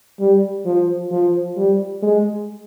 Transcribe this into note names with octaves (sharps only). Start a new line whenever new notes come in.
G3
F3
F3
G3
G#3